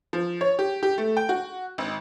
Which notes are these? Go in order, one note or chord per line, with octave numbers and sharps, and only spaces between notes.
F3
C#5
G4
G4
A3
G5
F#4
G#1